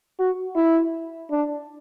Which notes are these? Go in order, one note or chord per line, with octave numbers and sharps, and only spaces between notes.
F#4
E4
D4